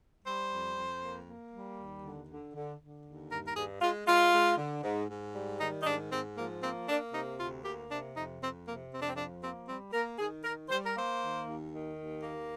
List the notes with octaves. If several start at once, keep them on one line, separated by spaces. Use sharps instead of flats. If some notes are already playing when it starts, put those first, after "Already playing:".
G3 C5
F2
F2
A#3
A#3
G3
D#2
D3
D3
D3
D3
D#2
G2 A#4
A#4
G2 G#4
G#3 F4
G#3 F4
G#3
D3
G#2
G#2
G3
D#3 D#4
D#4
G#2 D4
G#2 C4
F3 A#3
A#3 C4
A#3 D4
C3 D#4
D2 F4
A#3 G4
C3 D4
F2 D#4
F2 C4
C3 A#3
F2 C4
D4
C4
F3 D4
A#3 C4
G3 C4
A#3 A#4
D#3 G#4
D#3 A#4
G3 C5
A#4
A#3 C5
D#3
D#2
D#3
D#2
A#3